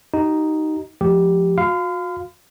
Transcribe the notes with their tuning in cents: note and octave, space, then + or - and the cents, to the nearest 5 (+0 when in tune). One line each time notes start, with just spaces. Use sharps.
D#4 +0 G4 -45
F3 +0 A3 -45 G4 +0
F#4 -40 F5 +0 C6 -45